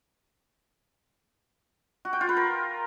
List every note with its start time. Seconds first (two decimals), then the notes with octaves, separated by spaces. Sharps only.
2.05 F#4
2.13 G5
2.21 F4
2.29 B4
2.37 A#4